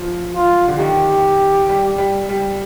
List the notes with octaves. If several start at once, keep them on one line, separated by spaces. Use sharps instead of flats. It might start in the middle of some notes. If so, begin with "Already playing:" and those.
Already playing: F3
F4
D3
D#3 G4
G3
G3
G3